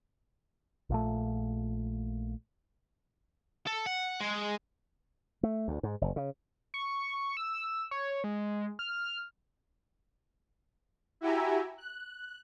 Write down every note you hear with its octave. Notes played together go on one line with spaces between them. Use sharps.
A#1 A#2 A3
A4
F#5
G#3
A3
D2
G#2
F#1
C#3
C#6
E6
C#5
G#3
F6
E4 F#4 G4 E5 G#5 A#5
F#6